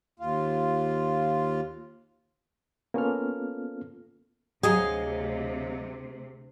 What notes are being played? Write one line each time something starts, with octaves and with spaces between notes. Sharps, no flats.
D#2 F4
A#3 B3 C#4 F4 A4 F6
D2 C3 F#3 G#4 D#5 F5